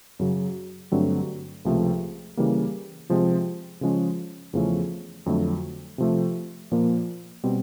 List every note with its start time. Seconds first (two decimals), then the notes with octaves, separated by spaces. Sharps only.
0.19 F#2 C#3 F#3
0.92 G2 D3 F#3 A3 C4
1.65 C#2 C3 F3 A3
2.37 C#3 E3 G3 A#3
3.09 C3 F3 G#3 C4
3.81 C#3 F3 G#3 C#4
4.53 E2 C#3 F3 A3 C#4
5.26 F2 D3 F#3 A3
5.98 C3 F3 A3
6.71 A#2 F3 A#3
7.44 B2 G3 C4